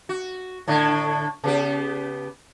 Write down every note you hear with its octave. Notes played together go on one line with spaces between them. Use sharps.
F#4
A2 D3 D4
C#3 B3 G4